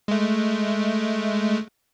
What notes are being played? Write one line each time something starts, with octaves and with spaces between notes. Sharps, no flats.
G#3 A3